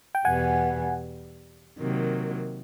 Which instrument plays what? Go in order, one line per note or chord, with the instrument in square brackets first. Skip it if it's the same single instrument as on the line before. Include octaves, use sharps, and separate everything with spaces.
[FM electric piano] G5
[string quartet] E2 B2 G3 B3 [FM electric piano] F#5 G#5
[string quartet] C3 D#3 F#3 A#3